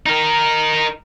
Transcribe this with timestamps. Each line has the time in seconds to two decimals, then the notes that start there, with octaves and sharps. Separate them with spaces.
0.06 D#4 A#4